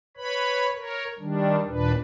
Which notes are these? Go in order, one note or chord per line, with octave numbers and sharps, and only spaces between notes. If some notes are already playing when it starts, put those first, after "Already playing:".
B4 C#5 B5
A#4 C#5
D#3 G3 D4
D#2 A#2 D4 B4